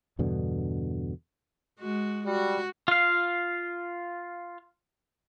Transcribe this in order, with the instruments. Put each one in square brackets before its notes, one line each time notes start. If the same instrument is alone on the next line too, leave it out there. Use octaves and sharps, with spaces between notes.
[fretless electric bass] E2 G2 B2 D3
[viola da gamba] G#3 F#4
[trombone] G3 [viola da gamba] F#4
[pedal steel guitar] F4 F5